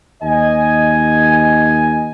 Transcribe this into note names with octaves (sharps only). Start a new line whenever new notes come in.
D#2 D#5 G#5